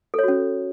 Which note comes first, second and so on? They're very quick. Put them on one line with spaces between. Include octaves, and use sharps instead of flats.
A4 C#5 F#4 C#4